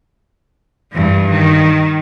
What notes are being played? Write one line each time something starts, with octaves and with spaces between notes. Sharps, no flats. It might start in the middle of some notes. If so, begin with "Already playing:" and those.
G2 E3
D#3